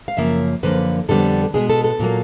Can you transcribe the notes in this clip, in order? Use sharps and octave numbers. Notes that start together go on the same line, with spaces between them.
F5
F#2 C#3 F3 A#3 E5
F#2 D3 F3 A#3 B4
F2 D3 G3 B3 A4
B2 G#3 B3 G#4
A4
A4
A#2 F#3 A#3